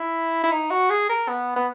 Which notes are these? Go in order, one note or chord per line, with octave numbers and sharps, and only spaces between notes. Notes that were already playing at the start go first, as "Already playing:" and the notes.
Already playing: E4
E4
D#4
F#4
G#4
A#4
B3
B3